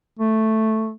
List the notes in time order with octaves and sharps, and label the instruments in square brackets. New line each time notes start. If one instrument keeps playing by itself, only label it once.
[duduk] A3